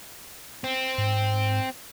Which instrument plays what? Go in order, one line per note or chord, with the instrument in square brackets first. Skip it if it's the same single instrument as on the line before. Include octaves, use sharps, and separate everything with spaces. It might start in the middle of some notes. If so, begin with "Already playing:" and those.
[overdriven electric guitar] C4
[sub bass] G#2